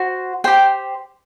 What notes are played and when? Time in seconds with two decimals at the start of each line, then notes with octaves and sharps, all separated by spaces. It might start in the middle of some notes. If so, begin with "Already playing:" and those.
Already playing: F#4 C5
0.44 G4 C5 G5